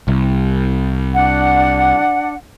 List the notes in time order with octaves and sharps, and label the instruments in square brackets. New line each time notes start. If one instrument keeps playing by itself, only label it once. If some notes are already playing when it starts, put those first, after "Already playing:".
[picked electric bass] C2
[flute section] D4 F#5